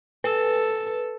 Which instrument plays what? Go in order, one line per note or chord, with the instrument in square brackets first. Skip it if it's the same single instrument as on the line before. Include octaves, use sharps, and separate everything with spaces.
[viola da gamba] A4 [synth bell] B4